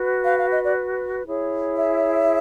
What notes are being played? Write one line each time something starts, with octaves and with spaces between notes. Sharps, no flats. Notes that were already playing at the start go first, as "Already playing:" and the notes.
Already playing: F#4 B4
F5
F5
D#5
D5
E4 G#4 C#5
E5